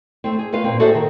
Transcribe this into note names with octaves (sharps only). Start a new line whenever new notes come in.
A3 C4
G#4
A3 F4 B4 F5
A#2 C4
F#4 G#4 A4 C5 E5
D#3